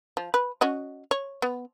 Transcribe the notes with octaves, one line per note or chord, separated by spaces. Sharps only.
F3
B4
C#4 F#4 D#5
C#5
B3